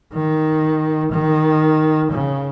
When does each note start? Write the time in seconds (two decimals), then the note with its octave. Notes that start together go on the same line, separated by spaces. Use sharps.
0.13 D#3
1.12 D#3
2.12 C#3